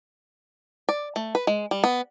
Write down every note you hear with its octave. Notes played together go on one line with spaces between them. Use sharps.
D5
A3
B4
G#3
G3
B3